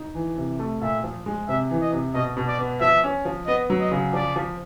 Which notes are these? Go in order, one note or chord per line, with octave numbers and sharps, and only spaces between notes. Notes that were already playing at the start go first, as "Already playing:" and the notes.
Already playing: D#4
E3
C3
A3
A#2 E5
F3
G#3
C3 E5
E3
D#5
C3
B2 D#5
B2
D5
B3
F3 E5
C#4
F3
B3 D#5
F#3
D#5
C#3
F3 D5
F3